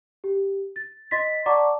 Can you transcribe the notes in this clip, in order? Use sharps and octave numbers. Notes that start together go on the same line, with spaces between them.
G4
A6
D#5 C6 A6 B6
D5 F#5 A5 A#5 C#6 D6